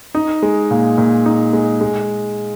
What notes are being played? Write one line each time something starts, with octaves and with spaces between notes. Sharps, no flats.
D#4
G#3
A#2
A#2
D#4
G#3
G#3